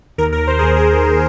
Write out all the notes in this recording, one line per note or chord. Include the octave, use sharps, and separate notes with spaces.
D#2 A#4
D#2 A#4
D#2 C5
G#4
D#2 A#4
D#2 G#4
D#2